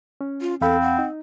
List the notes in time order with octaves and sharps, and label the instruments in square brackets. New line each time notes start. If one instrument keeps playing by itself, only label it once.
[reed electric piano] C#4
[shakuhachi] F4
[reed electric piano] E2 F5 B5 [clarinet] C4 [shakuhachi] A4
[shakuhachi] F#5
[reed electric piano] D#4